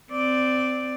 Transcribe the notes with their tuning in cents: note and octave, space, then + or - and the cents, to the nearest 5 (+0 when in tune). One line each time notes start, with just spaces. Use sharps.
C4 -20 D5 +0